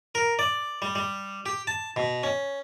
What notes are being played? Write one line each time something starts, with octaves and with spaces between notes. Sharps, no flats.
A#4
D5
G3
G3
G4
A5
B2
C#4